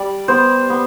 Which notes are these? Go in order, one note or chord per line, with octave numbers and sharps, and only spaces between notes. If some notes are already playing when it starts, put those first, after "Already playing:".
Already playing: G3 D5
B3 C5
B3